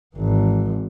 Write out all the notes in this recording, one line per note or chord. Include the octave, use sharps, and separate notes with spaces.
G#1 E3